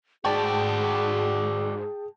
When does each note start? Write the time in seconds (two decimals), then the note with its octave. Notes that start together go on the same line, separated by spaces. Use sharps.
0.24 G#2 F#4 G#4 D5 G5 A5